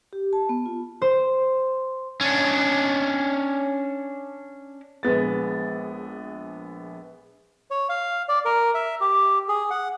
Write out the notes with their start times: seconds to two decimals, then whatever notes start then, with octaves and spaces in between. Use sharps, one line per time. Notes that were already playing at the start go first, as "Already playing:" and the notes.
0.13 G4
0.33 A5
0.49 B3
0.66 F4
1.02 C5
2.21 C#4 D4
5.03 A#1 G#3 B3 A6
7.71 C#5
7.89 F5
8.29 D5
8.45 A#4
8.74 E5
9.01 G4
9.49 G#4
9.71 F#5